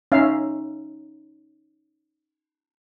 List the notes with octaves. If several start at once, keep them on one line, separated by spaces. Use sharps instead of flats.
C#4 D#4 E5 F5